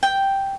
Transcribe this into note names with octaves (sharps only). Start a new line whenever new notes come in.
G5